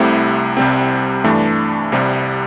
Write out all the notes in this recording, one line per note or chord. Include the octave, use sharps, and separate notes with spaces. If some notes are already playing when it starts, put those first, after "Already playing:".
Already playing: C2 C3 A3 E4 G4
C2 C3 G3 C4
G2 E3 A3 D4
C2 C3 G3